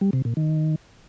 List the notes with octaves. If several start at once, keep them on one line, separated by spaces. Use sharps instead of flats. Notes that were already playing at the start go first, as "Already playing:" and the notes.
G3
C3
A#2
D#3